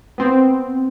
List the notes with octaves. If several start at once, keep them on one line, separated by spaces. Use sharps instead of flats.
B3 C4